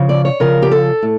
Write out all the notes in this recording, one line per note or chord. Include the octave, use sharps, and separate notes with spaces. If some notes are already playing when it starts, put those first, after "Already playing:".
Already playing: C#3 F3
D5
C#5
C#3 F3 A#4
G4
A4
A2